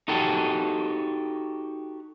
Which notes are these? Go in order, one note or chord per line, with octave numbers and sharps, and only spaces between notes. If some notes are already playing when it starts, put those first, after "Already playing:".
D#4 F#4 G4 A4